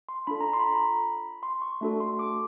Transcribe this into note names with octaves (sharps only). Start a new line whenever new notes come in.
C6
D4 F4 A4 B5
A#5
C6
B5
A#5
B5
C6
C#6
A3 D4 F#4 A4
C6
D6